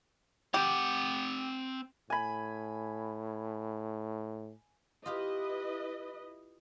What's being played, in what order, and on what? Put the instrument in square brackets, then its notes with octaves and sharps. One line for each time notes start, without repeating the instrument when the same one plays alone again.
[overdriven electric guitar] C4 F#5 [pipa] G4
[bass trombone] A2 [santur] G#5 B5
[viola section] E4 B4 D#5 [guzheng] F4 G4